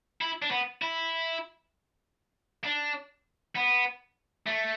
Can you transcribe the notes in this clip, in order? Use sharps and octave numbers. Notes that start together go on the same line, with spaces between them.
E4
D4
B3
E4
D4
B3
A3